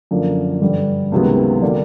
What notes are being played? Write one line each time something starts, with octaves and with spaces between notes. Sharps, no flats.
F#2 D3 F3 A#3
G2 D3 G3
C#2 C3 D#3 F#3 B3
D3 G3 A#3 D4